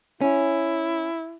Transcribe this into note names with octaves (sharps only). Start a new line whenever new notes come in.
C#4 E4